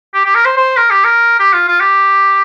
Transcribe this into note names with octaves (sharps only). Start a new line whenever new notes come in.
G4
G4
A#4
C5
C5
A#4
G4
A#4
G4
F4
F4
G4